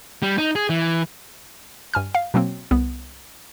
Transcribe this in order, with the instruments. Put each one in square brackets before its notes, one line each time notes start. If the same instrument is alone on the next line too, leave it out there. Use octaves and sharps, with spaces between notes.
[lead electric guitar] G3
D#4
G#4
E3
[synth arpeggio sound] G2 G#5 F6
F5
B2 F#3 A#3 C4
C2 B3